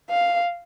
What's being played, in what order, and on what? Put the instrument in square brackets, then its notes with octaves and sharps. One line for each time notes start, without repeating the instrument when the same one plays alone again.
[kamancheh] F5